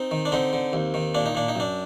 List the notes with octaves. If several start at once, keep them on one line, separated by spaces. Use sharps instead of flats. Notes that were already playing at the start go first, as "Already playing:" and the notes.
Already playing: C4 D#4
D#3
D4
D3 C4 D#4
D3
D#2
D#3
A#2 D4
D#4
A#2 D4
D#4
F#2 D4